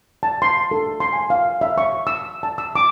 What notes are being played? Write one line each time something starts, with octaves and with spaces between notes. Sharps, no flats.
A5
C6
A4
C6
G#5
F5
E5
C#6
E6
A5
E6
D6